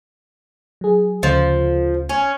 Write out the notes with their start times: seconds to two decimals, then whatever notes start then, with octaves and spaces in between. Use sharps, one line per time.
0.81 F#3 G#4
1.23 D2 C#3 F3 A3
2.09 C#4